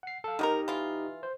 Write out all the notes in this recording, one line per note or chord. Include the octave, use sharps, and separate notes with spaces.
F#5 C7
A4 F5
D#3 D#4 F#4 G4 A#4 D#5
E3 F4
C5